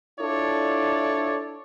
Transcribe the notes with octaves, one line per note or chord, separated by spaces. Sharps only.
D4 E4 F4 A4 C#5 D5